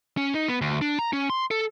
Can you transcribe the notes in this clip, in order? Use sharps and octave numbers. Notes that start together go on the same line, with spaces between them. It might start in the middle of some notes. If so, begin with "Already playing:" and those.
C#4
D#4
B3
D2
D4
A#5
C#4
C6
A4